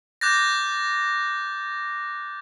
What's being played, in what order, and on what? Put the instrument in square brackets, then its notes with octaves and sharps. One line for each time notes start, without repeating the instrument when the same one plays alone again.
[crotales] D6 F#6 G6 A6 A#6